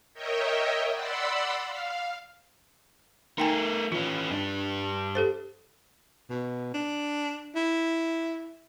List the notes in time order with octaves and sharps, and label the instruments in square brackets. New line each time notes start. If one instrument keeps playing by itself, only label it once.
[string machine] A#4 C#5 D#5 E5 G5
D5 F#5 B5 C6 E6
F5
[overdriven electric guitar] A3 A#4 [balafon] D#4 G5 G#5
[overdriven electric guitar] E3 C#4 [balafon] F4
[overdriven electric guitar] G2 D4
[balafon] G4 A4 C5
[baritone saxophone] B2
D4
E4